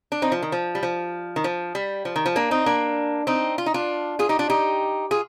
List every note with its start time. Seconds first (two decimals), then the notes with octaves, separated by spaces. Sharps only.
0.12 D4
0.22 C4 D#4
0.32 F3
0.42 D#3
0.52 F3
0.75 G3
0.83 F3
1.36 D#3
1.44 F3
1.75 G3
2.05 F3
2.16 D#3
2.26 F3
2.36 A#3 D4
2.51 C4 D#4
2.66 A#3 D4
3.27 C4 D#4
3.58 F4
3.66 D#4
3.74 D4 F4
4.19 F4 G#4
4.29 D#4 G4
4.39 D4 F4
4.50 D#4 G4
5.11 F4 G#4